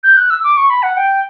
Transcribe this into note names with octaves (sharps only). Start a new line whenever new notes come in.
G6
F#6
E6
D6
C#6
B5
F#5
G5